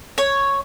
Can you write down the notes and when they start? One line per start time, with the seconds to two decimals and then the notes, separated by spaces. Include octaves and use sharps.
0.18 C#5